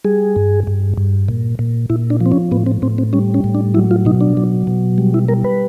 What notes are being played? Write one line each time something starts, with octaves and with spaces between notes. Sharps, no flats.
G3 G#4
G2
G2
G2
A#2
A#2
A#2 E4
D4
F3
C4
C#4
A2 B3
C4
A2 C4
C4
G3 C#4
C#4
A2
D4
F#3 E4
F4
B2 D#4
D4
F#3
B2
G3
E4
G3 A#4
B4